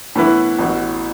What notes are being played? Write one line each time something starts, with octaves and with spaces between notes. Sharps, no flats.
A2 E3 B3 E4 B4
A1 A2 E3 B3 F#4